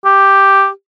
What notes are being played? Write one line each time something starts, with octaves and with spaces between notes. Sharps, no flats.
G4